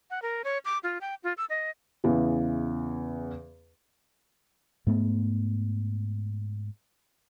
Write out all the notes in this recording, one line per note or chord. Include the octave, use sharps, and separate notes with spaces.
F#5
A#4
C#5
D6
F4
G5
F4
E6
D#5
E2 C#3 E3
G#2 A3 B3